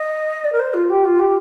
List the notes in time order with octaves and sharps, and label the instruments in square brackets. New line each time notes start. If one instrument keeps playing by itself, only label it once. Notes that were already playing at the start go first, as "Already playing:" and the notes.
Already playing: [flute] D#5
D5
A#4
C5
F4
G4
F4
G4